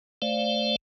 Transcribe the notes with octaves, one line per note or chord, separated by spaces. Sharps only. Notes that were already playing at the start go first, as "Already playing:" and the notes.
A3 C5 D5 F5